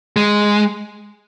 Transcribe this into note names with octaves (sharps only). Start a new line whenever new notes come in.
G#3